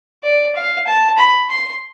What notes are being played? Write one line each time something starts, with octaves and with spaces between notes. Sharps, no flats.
D5
F5
A5
B5
C6